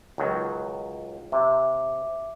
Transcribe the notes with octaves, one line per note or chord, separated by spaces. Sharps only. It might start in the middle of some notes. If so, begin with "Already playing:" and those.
C#2 D#3 F#3
C3 E5 D6